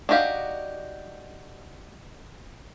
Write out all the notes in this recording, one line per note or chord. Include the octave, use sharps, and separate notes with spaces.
D4 D#4 F#4 G4 F5